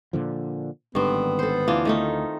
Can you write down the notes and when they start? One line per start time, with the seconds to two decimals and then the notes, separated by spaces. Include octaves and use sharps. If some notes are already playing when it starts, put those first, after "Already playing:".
0.13 A#2 D3 F3
0.95 G#1 G2 D3 D#3 B3 C4
1.39 A4 C5
1.68 D2 E3 D4 F4
1.85 D#3 A3 D#4